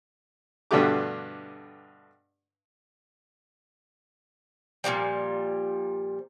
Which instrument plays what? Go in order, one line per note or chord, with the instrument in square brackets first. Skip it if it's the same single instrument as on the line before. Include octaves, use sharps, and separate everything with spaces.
[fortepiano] G2 B2 D3 A3 G4 D6
[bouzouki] A#2 D#3 F3 G3